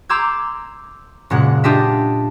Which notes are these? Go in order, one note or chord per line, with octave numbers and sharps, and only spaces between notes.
A#5 C6 D6 E6 G6 G#6
F#1 A#2 G#3 F#5 F#6
D4 F4 G4 D#5 E5